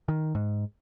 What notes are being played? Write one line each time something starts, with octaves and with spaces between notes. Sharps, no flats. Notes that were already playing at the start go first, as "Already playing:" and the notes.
D#3
G#2